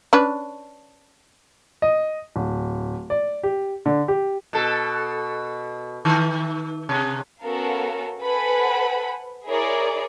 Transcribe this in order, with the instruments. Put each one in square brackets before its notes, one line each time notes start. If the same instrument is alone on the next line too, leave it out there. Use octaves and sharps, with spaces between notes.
[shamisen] C#4 D4 B4
[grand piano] D#5
D1
D5
G4
D3
G4
[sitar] B2 A4
D#3
C3
[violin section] B3 C#4 F#4 A4 A#4 F5
A4 B4 C5 F#5 G#5 B5
E4 G#4 A#4 C#5 D5